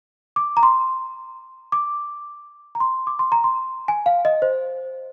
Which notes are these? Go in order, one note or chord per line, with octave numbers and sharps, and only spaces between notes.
D6
A#5
C6
D6
A#5
C6
D6
C6
A#5
C6
G#5
F5
D#5
C5